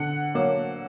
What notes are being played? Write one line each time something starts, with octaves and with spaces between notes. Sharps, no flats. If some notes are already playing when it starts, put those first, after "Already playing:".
Already playing: D3 F#5
F#3 A#3